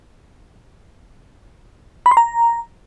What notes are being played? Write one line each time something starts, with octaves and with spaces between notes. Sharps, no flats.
B5
C6
A#5